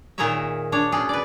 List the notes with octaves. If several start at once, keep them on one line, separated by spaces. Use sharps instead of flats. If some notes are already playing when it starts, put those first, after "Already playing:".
A#2 D#3 G#4 A#4 C#5 E5
D4 C#5
B2 C#4 G#4
B4 D5